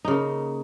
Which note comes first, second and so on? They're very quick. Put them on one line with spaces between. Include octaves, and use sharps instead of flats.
D#4 C#3 A#3